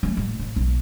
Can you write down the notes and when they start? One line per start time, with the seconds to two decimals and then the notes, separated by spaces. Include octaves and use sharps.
0.03 A3 C#4
0.17 A1 A3
0.39 A1
0.56 B1